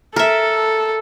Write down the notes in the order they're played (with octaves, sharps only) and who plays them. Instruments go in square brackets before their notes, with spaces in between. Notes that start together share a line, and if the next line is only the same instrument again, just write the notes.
[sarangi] A4 [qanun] A#4 E5